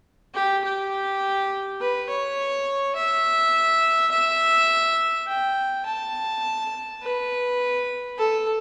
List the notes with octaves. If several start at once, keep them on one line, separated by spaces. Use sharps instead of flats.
G4
G4
B4
C#5
E5
E5
G5
A5
B4
A4